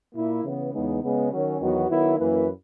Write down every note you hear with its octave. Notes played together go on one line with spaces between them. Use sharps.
A#2 A#3 E4
C#3 E3 B3
E2 C#3 G#3 B3 D#4
C#3 G#3 B3
D#3 F#3 C#4
E2 D#3 F#3 B3 F#4
D#3 F#3 B3 E4
F#2 E3 A#3 E4 B4